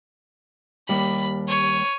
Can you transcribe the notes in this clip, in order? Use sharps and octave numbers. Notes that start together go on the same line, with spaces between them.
D#2 G3 B5
C#5 D#7